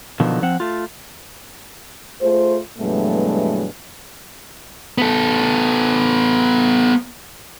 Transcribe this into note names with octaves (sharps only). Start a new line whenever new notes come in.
B2 D3 D#3 F3 F#3
F3 C4 F#5
A3 F4
A3 F4 G#4 C5
G2 B2 E3 F#3 G#3 A3
B3 A4